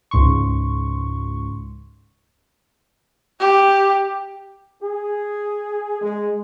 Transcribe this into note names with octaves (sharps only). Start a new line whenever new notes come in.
C#2 G#2 C6 C#6
G4
G#4
G#3